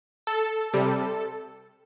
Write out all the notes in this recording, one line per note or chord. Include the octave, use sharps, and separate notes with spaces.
A4
C3 G3